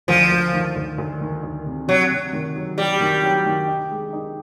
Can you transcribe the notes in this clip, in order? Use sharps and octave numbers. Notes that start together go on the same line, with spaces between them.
D2 F3
D2
D#3
D2
D2
D#3
D2
C3
C3 F#3
C3
D#3
F#3
F#3 G3
D#3
F#3
D#3
D#4
G#3
D#4